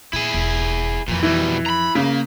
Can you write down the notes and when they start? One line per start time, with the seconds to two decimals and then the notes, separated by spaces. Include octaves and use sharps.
0.13 A#2 E4 G#4
0.34 E1
1.08 F2 A#2 E3 F3
1.23 B2 E3 G3
1.66 A#5 B5
1.95 C#3 A#3